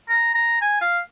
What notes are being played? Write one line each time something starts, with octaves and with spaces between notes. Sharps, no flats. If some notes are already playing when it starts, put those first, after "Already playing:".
A#5
A#5
G#5
F5